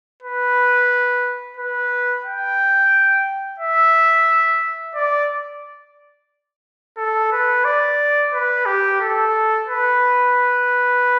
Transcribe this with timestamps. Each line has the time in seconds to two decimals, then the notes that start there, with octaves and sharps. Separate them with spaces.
0.23 B4
1.57 B4
2.25 G5
3.59 E5
4.95 D5
6.97 A4
7.32 B4
7.65 D5
8.33 B4
8.66 G4
9.01 A4
9.68 B4